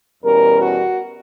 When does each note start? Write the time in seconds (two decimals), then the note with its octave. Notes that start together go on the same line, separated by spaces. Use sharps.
0.23 E2 B2 G3 C#4 A#4
0.61 F#4